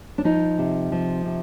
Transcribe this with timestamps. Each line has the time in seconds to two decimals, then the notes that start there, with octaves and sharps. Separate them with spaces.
0.18 D4
0.24 F3 D#4
0.58 C3
0.92 F3
1.25 C3